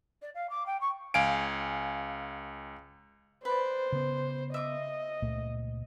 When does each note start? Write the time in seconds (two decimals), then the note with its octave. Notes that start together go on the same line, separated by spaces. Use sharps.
0.22 D5
0.34 F5
0.50 D6
0.66 G5
0.81 C#6
1.14 C#2 F5 G#5 D7
3.45 B4 C5 D5
3.92 C#3 B3
4.54 D#5 E5 D6
5.22 C#2 A#2 A3